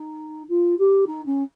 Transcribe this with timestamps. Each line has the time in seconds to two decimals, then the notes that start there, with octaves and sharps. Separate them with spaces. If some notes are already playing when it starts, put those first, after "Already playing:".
Already playing: D#4
0.49 F4
0.79 G4
1.07 D#4
1.26 C#4